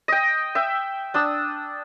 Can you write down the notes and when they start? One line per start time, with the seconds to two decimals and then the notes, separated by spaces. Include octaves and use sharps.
0.08 D#5 G5
0.55 E5 G5
1.14 D4 D#6 E6